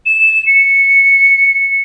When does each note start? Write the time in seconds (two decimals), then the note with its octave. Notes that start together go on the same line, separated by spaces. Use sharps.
0.06 E7
0.47 C#7